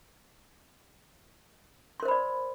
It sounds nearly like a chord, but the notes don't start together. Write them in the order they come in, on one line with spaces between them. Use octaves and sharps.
C6 A#4 C5 B5 D5